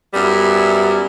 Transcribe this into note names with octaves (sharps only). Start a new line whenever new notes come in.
F#2 G3 B3 E4